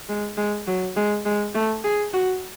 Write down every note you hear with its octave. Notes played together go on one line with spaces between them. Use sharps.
G#3
G#3
F#3
G#3
G#3
A3
G#4
F#4